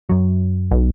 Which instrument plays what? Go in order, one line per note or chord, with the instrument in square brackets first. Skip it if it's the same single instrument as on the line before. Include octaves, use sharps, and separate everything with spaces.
[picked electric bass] F#2 F#3
[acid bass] B1